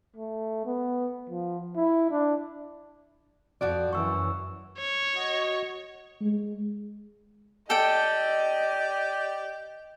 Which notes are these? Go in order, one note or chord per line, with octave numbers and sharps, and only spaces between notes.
A3
B3
F3
E4
D4
F2 F3 F#4 D5
F#2 E3 C#6 E6
C#5
F#4 D#5
G#3
G4 A4 D5 D#5 G5